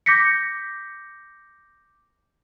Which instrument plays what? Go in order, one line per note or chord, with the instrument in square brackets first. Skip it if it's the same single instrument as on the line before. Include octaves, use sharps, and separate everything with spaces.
[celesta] D6 G6 A#6 B6 C#7